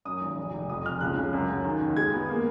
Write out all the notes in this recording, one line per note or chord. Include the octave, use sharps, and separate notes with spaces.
F#2 D#6
G#1
F1
F1
F2 D#6
F2 F6
C#2 F#6
C#3
F#2
F#2
D#3
D#2
G#3 G#6
B3
A#3